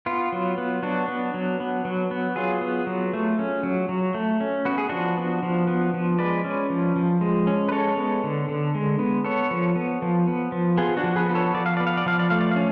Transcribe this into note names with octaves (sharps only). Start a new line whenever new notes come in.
B3 F4
F#3
B3
F#3 D4 F#4
B3
F#3
B3
F#3
B3
F#3 F4 G#4
B3
F#3
A3
C#4
F#3
F#3
A3
C#4
B3 F#4
G#4
F3 D4 F#4
B3
F3
B3
F3
G#3 B4 D5
C#4
F3
F3
G#3
C#4
B4
G#3 A4 C#5
B3
D3
D3
G#3
B3
B3 A4 C#5
F3
B3
F3
B3
F3
B3 F4 G#4
D4 F#4
F3
G#4 B4
B3
A4 C#5
F3 D5
F5
B3 D5
F5
D5
F3 F5
D5
A3 F5
D5
C#4 F5